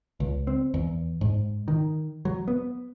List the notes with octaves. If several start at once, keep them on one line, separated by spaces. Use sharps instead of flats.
C#2
C4
E2
G#2
D#3
F#3
B3